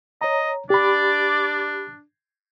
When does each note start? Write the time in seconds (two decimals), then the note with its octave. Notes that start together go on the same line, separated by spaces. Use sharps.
0.21 C#5 D#5 A#5
0.70 D4 G4 D5 B5